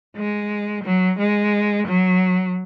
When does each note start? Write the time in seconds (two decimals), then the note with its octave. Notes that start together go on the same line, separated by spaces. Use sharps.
0.17 G#3
0.84 F#3
1.19 G#3
1.87 F#3